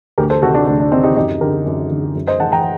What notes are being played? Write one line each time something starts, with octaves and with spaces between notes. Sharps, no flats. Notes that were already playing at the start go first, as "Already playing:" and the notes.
D2 G4 A#4
A4 C5
C3 D#3 F#4 A4
D4 F#4
D2 D4
D4
C3 D#3 C4 D#4
D#4 G4
F#2 D#4 G4
D3 G4 A#4
F#2
D3
F#2
C5 D#5
D#3 F#5 A5
G5 A#5